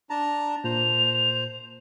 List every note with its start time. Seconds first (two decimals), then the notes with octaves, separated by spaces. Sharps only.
0.10 D4 A5 A#5
0.64 A#2 C5 F7